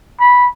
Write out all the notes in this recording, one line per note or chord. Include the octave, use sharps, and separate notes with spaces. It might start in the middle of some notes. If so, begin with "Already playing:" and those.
B5